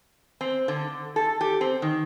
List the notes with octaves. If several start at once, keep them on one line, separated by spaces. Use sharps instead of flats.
C4
D3
A4
G4
C4
D#3